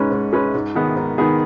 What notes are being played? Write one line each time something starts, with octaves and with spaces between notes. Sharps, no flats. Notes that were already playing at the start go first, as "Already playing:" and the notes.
Already playing: G#2 G#3 C#4 B4
G#2
G#3 C#4 B4
G#2
D#3 B3 G#4
G#2
D#3 B3 G#4